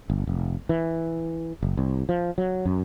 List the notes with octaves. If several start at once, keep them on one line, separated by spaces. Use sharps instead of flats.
G1
F1
E3
F#1
C2
F3
F#3
F#2